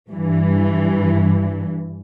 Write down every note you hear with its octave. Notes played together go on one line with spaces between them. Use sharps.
G2 E3